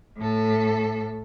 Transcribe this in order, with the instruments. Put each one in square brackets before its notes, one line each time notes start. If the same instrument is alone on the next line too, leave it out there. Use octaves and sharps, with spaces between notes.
[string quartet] A2 A4